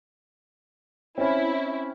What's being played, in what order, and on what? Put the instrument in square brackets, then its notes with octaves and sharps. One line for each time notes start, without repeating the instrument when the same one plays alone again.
[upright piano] C4 C#4 [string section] E4